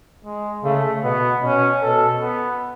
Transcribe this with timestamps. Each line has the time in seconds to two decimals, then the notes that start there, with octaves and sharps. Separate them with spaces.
0.25 G#3
0.64 C#3 A3
1.04 B2 B3
1.42 B2 C#4
1.82 B2 A4
2.21 B3